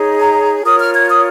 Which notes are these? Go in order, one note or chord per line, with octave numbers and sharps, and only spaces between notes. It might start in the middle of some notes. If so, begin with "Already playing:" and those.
Already playing: D#4 G#4 C#5
A#5
F4 A#4 C#5 D#6
F6
G#6
D#6